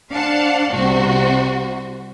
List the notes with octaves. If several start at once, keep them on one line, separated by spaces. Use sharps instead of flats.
D4 C5 F5 F#5 A5
C2 C3 F#4 C5